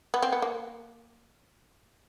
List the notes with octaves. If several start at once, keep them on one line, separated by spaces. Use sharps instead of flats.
B3
C4
B3
A#3